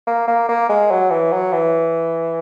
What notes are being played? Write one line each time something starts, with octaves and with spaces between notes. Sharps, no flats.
A#3
A#3
A#3
G#3
F#3
E3
F#3
E3